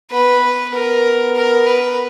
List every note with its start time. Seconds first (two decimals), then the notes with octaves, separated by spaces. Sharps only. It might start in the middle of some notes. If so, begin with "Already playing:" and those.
0.11 B3 B4
0.73 B3 A#4
1.36 A#4
1.67 B4